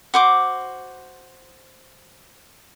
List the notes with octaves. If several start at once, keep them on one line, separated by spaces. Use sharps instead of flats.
F#4 C5 D6